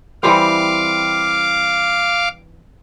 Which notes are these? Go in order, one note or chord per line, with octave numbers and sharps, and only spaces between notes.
E3 G3 C4 F5 D6